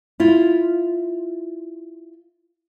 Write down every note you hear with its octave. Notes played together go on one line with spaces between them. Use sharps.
E4 F4